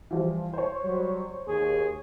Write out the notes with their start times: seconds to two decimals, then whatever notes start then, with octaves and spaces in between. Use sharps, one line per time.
0.11 E3 F3 G3
0.53 C5 C#5
0.84 F#3 G3
1.47 D#2 G#4